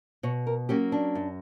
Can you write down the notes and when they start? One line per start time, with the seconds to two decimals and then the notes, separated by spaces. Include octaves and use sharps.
0.23 B2 C#5
0.47 A#4
0.69 F#3 A#3 C#4 G4
0.92 D4
1.15 F#2